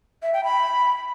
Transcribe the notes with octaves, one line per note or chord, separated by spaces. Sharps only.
E5
G5
B5